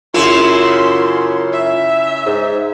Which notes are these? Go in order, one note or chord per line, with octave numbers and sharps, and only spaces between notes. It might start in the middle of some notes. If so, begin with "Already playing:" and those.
F#2 C#3 E4 F4 C6
E5
G#2